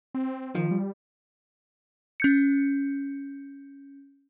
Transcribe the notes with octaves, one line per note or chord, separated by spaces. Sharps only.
C4
D#3 F3
G3
C#4 G6 C#7